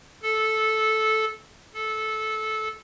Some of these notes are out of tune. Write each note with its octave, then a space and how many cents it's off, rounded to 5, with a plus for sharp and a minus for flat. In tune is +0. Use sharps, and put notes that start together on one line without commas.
A4 -10
A4 -15